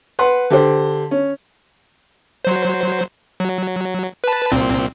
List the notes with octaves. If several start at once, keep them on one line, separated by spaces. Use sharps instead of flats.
B4 F#5 C6
D3 G4 C5
C#4
F#3 C5
F#3
B4 A5
C2 A#2 C4